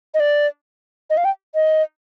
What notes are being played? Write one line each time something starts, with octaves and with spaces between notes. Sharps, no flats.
D#5
D5
D#5
F5
G5
D#5